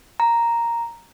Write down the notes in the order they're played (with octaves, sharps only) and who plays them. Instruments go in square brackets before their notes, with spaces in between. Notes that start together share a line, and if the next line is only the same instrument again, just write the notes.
[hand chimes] A#5